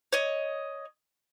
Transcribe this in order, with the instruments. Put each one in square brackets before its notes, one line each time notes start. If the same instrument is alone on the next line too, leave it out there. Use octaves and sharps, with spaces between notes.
[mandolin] C#5 D#5